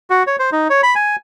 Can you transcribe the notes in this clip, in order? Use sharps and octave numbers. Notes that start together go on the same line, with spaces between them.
F#4
C#5
C5
D#4
C#5
B5
G#5